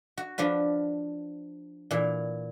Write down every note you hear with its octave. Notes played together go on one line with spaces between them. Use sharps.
F#4
F3 D4 F4 B4
A#2 E3